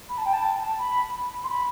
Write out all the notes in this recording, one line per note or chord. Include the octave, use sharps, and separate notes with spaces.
B5
A5
G5
A5
B5
C6
B5